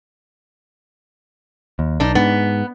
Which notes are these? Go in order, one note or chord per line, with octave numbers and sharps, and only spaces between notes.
D#2
B1 D4 D#4
G#2 B3